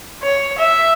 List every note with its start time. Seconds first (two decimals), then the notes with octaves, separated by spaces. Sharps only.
0.23 C#5
0.58 E5